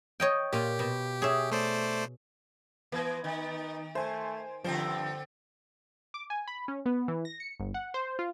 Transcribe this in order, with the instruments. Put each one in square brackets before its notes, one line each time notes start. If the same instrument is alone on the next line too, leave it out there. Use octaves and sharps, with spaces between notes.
[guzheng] C#5 D#5 G5
[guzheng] A#2 F4 [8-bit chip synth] G4
[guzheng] B2
G#4 C#5 E5
[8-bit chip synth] A3 C5 D5
[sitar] E3 [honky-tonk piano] B3 G#6
[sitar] D#3 [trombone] D#4
[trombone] A3 [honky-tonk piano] C5 G#5
[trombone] G2 [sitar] D3 C4 C5 [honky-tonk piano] F3
[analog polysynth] D6
G#5
B5
C#4
B3
E3
A#6
C#7
G1
F#5
C5
F4